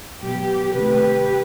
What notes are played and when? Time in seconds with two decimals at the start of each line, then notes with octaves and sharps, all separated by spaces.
0.22 B2 F#3 B3 G4
0.74 C3 D#3 A3 G4 B4